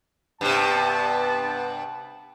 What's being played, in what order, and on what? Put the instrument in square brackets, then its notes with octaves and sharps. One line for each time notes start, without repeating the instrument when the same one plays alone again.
[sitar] G2 C3 [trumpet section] B3 A5